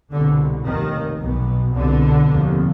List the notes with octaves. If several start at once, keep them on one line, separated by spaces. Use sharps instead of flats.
C2 B2 D3
F1 D#2 D#3
B1 B2
C2 B2 D3
F1 D#2